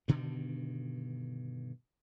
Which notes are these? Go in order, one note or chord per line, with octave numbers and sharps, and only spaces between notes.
G2 B2 D3 D#3